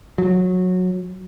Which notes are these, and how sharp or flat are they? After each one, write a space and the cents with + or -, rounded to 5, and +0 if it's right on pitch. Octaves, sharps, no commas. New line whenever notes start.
F#3 -15